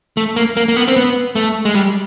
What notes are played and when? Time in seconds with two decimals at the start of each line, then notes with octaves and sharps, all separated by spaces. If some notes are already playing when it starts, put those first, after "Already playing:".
0.17 A3
0.36 A#3
0.57 A#3
0.68 A#3
0.76 B3
0.88 C4
0.96 B3
1.36 A3
1.65 G#3
1.75 G3